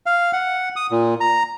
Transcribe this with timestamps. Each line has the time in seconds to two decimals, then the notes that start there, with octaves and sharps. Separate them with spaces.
0.06 F5
0.33 F#5
0.76 D#6
0.91 A#2
1.21 A#5